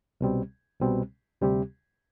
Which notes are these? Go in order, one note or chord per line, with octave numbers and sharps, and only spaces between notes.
C2 B2 G3 C4
C2 B2 G3 C4
D2 C3 G3 C4 G4